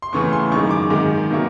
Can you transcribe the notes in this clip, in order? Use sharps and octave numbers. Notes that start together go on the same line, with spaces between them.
C6
E2 C#3 E3 A3 C#6
C6
F#2 D#3 G#3 C#6
D6
G#2 D#3 G#3
B2 F#3 A#3